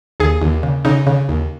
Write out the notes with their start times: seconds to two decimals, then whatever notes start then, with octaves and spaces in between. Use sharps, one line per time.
0.20 D#2 G#4
0.42 D#2
0.63 C#3
0.85 C#3 D#4
1.07 C#3
1.29 D#2